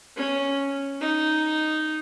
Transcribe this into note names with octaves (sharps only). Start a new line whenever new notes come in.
C#4
D#4